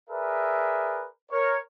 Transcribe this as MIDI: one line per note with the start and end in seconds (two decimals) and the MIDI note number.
0.10 1.06 68
0.10 1.06 70
0.10 1.06 71
0.10 1.06 74
0.10 1.06 76
1.31 1.57 70
1.31 1.57 73